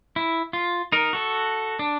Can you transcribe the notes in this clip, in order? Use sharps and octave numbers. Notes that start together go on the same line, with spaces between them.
E4
F4
D#4 A#4
F#4 A4
D4